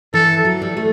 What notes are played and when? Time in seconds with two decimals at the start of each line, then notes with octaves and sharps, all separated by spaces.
0.14 E3 A4
0.45 F#3
0.62 G3
0.77 A3